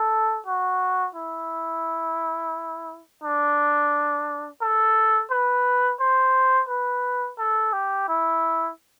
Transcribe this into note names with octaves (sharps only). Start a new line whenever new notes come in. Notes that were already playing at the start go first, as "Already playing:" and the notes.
Already playing: A4
F#4
E4
D4
A4
B4
C5
B4
A4
G4
E4